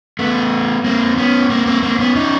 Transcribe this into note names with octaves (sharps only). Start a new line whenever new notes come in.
A3 B3
A#3 C4
B3 C#4
A#3 C4
A#3 C4
A#3 C4
B3 C#4
C#4 D#4